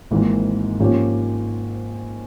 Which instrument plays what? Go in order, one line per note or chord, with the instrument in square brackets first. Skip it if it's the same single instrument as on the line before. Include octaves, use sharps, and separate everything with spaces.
[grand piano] G#1 G#2 E3 A#3
G#2 F3 A#3 C#4 G4